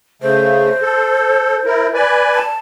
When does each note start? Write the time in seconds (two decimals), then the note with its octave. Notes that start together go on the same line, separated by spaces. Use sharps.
0.22 C#3 A3 C5
0.82 A4
1.65 E4 A#4
1.94 B4 D5 G#5
2.34 A5